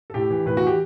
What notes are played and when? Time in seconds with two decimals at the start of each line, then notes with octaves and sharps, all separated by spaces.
0.10 A4
0.14 A2 G4
0.30 E3
0.46 A2 B4
0.57 F#4
0.62 E3 G4